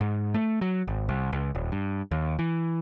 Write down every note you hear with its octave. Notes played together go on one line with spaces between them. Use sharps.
G#2
A3
F#3
G#1
C2
C#2
D#1
G2
D#2
E3